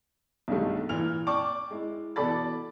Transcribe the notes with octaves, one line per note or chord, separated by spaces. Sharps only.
B1 G2 D#3 G#3 A3
A#2 E3 F6 F7
D5 G5 A5 C#6 D6
G#3 E4
B2 E3 A4 D5 B5 A6